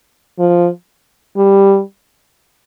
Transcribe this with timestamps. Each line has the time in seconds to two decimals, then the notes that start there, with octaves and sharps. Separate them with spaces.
0.39 F3
1.36 G3